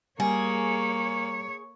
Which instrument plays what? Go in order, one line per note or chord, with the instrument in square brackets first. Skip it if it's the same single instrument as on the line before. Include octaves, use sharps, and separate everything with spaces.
[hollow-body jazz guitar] G3 [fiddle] A#3 [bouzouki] G#4 [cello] C#5